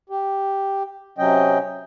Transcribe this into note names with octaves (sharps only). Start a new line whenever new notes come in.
G4
C3 F#3 C#4 D#5 G5